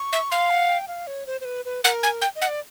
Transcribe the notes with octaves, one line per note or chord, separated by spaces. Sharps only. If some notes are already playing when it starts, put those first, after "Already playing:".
Already playing: C#6
E5
F5 C6
F#5
G5
F5
C#5
C5
C5
B4
B4
A#4 F#5
G#5
G5
D#5
F#5
D5